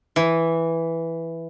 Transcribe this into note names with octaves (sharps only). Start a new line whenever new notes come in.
E3